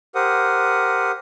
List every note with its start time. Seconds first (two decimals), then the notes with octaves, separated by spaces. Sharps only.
0.15 G4 A#4 C5 F#5 D#6